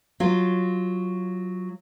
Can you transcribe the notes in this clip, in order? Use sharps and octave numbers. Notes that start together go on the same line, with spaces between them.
F#3 F4